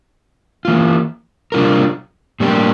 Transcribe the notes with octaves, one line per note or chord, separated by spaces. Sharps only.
E3 A#3 F4
C3 G3 D4 F4 A#4
A2 G3 A#3 D4 G4